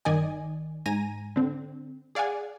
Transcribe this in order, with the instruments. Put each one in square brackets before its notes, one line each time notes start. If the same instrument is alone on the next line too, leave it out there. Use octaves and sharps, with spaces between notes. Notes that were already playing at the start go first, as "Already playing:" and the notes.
[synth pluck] G1 D#3 D5 D#5 G#5
G#2 G#5 A#5 A#6 D#7
D3 C4
G#4 D5 F5 F#5 G#5